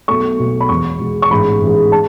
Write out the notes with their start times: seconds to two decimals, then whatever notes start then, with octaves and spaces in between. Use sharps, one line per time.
0.08 B1 B2 A3 C#6
0.39 B1 B2 A3
0.60 B5
0.69 E1 E2 B2 G#3 B3 C#6
1.00 E1 E2 B2 G#3 B3
1.22 C#6
1.31 A1 G#2 G#3 B5
1.61 A1 G#2 G#3
1.92 A5